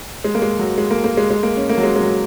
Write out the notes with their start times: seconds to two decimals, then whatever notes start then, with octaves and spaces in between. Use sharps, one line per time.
0.24 G#3
0.35 A#3
0.42 G#3
0.59 F#3
0.78 G#3
0.91 A#3
1.04 A#3
1.17 G#3
1.30 G#3
1.43 A#3
1.57 C#4
1.70 A#3
1.78 F#3
1.83 G#3
1.96 G#3
2.01 F#3